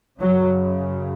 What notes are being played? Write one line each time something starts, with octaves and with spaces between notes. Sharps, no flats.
F#2 C#3 F#3